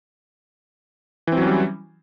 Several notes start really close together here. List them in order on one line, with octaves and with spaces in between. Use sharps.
E3 C4 F#3 C#4 G3